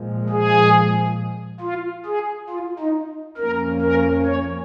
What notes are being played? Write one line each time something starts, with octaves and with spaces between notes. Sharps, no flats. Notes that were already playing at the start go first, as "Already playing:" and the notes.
Already playing: A#2 F3 G#3
G#4
F4
G#4
F4
D#4
F2 F3 A#3 C#4 A#4
A#4
C#5